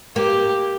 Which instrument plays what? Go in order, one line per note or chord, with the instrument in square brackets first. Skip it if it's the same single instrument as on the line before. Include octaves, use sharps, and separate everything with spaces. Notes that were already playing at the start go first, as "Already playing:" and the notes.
[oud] A#3 [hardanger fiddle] G4